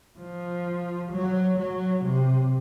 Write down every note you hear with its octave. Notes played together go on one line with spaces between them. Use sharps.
F3
F#3
F#3
C3